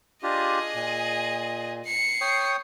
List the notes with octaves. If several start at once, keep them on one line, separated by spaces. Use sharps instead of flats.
D4 F4 G4 G#4 D#5
A#2
C7 C#7
C#5 G5 D#6